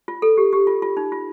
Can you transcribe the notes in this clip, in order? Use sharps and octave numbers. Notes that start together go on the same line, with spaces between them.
F4
A4
G4
G4
F4
F4
D#4
F4